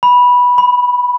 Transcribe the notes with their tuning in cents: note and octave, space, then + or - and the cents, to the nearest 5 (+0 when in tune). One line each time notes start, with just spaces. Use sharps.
B5 -10
B5 +25